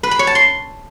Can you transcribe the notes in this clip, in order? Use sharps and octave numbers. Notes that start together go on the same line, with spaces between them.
B4
B5
C#5
A5
C6